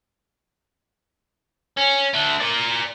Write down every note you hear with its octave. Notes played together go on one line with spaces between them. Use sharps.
C#4
A3 D4
A#4 D5